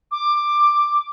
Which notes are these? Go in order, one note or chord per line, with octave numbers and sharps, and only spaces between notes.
D6